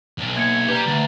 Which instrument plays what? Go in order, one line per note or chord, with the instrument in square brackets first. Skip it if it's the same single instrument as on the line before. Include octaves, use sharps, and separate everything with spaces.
[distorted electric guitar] B1
[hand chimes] A#3 G#6 C#7
[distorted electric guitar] G3 G4 [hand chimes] B4 A#5
[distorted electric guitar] D2 [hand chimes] A6